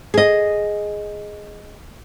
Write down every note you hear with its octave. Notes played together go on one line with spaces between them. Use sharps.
G#4 D#5